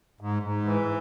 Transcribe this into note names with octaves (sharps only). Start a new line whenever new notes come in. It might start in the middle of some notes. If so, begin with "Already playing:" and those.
G#2
G#2
E3